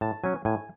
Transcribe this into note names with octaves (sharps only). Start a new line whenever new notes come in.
A2 A5
F#3 C#4 G#5
A2 G#5